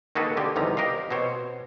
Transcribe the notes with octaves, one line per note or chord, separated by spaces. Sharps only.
D#3 A#3 F#4 G#4 A4 B4
D3 G4 G#5
E2 C3 D#3 F3 G3 A#5
G4 A#4 D#5 F5
B2 C4 C5 C#5